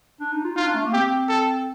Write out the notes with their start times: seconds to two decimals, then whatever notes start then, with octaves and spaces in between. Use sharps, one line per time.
0.20 D4
0.32 D#4
0.44 F4
0.56 D#4 F4
0.66 D4
0.75 A3
0.85 A#3
0.93 C4 G4
1.28 A4